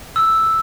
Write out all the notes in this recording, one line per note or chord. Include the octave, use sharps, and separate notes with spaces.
E6